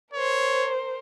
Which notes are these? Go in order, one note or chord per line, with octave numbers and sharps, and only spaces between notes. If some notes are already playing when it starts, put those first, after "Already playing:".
A#4 C5 C#5